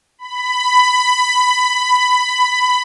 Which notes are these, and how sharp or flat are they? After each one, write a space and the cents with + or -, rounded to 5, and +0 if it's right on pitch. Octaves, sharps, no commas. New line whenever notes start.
B5 +15